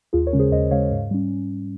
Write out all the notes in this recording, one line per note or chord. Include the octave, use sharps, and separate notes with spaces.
D#2 F4 G#4
A#4 C#5
C#3 G#3 C#4
G#4 C5
D#2 C5 D#5
C#3 G#3 C#4 C#5 F5
G#2
G3 C#4